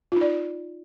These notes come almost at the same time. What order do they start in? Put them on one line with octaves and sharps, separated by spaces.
F4 D#4 D5